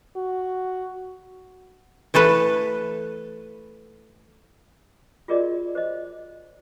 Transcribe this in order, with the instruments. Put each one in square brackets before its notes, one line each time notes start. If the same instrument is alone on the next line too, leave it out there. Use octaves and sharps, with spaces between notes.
[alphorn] F#4
[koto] E3 A3 A4 B4
[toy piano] F4 F#4 G#4 A#4 D5 D#5
C5 D#5